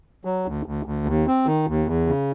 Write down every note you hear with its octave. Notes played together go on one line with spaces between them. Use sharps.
F#3
D2
D2
D2
D#2
C4
D#3
D#2
E2
C#3